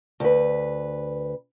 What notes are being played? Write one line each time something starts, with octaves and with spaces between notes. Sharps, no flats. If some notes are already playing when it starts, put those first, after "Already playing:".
D2 B4